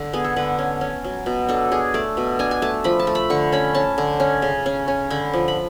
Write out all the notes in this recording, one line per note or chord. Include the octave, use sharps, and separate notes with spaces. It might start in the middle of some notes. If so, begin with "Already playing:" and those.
Already playing: D3
B3 G#4
A4
D3 B4
C#4
C#4
F#3
B2
D4 A4
D4 G#4
A3 D5
B2
D4 G#5
G#5
A3 A5
F3 B5
A5
A3
B5
D3 C#6
C#4 B5
C#4 A5
D3
C#4
C#3
C#4
C#4
D3 B5
F3
B5